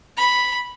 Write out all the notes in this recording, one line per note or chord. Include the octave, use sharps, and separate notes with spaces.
B5